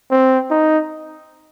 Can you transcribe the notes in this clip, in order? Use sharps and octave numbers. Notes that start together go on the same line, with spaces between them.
C4
D#4